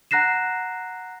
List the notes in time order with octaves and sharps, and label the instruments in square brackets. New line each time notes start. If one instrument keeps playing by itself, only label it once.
[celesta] F#5 A#5 F#6 A#6 C7 E7